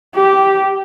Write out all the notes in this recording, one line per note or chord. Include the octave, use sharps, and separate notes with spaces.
G4